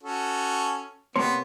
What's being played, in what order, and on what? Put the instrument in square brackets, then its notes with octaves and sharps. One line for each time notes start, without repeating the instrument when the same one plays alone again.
[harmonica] C#4 F#4 A4
[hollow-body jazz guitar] C3 A#3 C#5 [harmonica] B3 [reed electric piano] C6